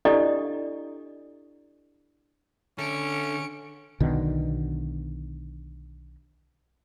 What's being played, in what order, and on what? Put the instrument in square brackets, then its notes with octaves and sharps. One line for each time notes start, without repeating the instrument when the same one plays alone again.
[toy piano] D4 E4 G4 A4 D5 D#5
[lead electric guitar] D3 [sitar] A3 A4 [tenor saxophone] C#4 [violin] C#7 D7
[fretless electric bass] B1 B2 D3 D#3